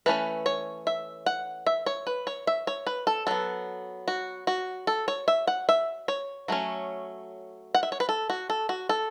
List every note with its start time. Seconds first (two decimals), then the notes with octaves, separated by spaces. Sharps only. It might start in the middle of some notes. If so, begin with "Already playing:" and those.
0.06 E3 A3 C#4 B4
0.46 C#5
0.87 E5
1.26 F#5
1.67 E5
1.86 C#5
2.07 B4
2.27 C#5
2.47 E5
2.67 C#5
2.87 B4
3.07 A4
3.27 F#3 B3 A4
4.08 F#4
4.47 F#4
4.87 A4
5.08 C#5
5.28 E5
5.47 F#5
5.69 E5
6.08 C#5
6.48 F#3 A3 C#4
7.75 F#5
7.83 E5
7.92 C#5
8.00 B4
8.09 A4
8.30 F#4
8.50 A4
8.69 F#4
8.89 A4